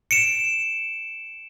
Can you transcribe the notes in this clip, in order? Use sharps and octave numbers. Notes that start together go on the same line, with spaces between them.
C#7 D7 E7